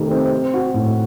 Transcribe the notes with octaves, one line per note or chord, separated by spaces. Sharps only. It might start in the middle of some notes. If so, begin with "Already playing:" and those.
Already playing: C3 D#3 A3
C4
C4
F#4
A2